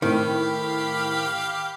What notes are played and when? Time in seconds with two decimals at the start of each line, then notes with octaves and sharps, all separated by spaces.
0.02 A2 D#3 A3 C4 G4 F5 B5